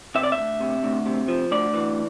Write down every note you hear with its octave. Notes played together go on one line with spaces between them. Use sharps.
C3 E5
D5
E5
D2
C3
D2
C3
F3
D2 D5
E3